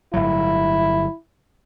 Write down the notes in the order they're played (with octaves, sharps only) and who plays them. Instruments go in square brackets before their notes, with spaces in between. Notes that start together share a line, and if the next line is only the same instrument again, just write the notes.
[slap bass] G1 A2 F#3 [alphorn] E4